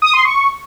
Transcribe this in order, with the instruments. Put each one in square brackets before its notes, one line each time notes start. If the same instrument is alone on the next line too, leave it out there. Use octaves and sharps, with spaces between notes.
[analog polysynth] D#6
C6
C#6